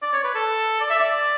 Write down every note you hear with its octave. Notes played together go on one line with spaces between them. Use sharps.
D5
C#5
B4
A4
D5
E5
D5